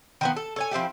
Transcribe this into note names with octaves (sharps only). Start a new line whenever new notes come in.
D#3 F3 B3
A4
A4 C#5 G#5
F3 C4 E4 G4